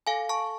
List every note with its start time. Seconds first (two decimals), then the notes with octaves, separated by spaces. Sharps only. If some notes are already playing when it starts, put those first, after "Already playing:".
0.07 A4 F5 G#5
0.29 A5 C#6